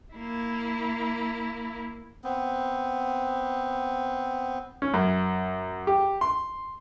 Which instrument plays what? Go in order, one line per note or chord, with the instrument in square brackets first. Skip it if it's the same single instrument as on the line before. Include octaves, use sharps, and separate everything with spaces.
[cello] A#3 E4
[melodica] B3 C4
[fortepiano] C#4
F#2
G4
C6